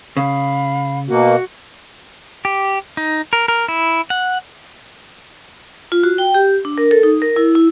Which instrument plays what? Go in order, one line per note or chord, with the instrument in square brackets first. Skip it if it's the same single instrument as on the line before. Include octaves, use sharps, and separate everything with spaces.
[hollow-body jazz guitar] C#3 [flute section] F5 B5
[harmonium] B2 A#3 [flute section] F#4
[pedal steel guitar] G4
D#4
A#4
A#4
E4
F#5
[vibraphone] F4
F#4
G5
G4
D4
A#4
A4
D#4
A#4
E4
E4